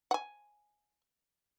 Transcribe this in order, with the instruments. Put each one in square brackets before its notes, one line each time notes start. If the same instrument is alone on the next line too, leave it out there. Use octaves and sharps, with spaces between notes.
[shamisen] F#5 G#5